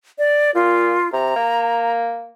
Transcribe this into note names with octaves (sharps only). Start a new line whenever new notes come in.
D5
A#2 F4
C3 A#5
A#3